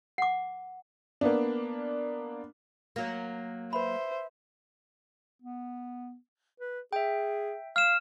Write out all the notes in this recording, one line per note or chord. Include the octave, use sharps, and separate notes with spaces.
F#5 D6
A#3 B3 D4
F#3 A#3
B4 C5 E5 B5
B3
B4
G#4 E5 G5
F5 F6 E7